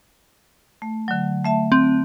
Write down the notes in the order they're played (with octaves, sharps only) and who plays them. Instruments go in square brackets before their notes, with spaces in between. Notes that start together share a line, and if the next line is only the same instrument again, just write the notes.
[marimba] A3
D3 F#3
A3 E5 A5
[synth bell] C4